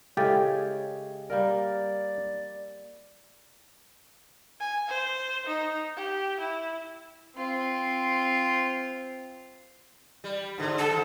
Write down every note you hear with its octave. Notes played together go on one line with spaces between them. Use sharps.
C#3 G#3 E4 G4 A4 C#5 G5 A6
G3 A#3 A#4 D5
G#5
C5
D#4
G4
E4
C4 F4
G3
G#2 D3
A4
G2 D#3